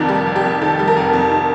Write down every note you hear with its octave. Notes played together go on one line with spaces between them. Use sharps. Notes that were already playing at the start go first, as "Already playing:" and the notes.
Already playing: F1 F2 D#3 A#4 D5
G3
F1
G4
F2
D#3 A4
G3
A#4
F1
F2
D#3